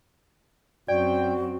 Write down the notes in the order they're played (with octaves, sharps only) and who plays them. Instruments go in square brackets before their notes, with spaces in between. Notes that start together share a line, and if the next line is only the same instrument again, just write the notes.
[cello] F#2 C4 [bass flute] F#4 [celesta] D5 [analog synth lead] G5